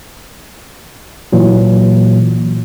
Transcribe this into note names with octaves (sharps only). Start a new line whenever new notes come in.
A#2 E3 F#3